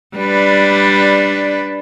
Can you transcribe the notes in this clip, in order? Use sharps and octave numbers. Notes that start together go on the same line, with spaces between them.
G3 D4 B4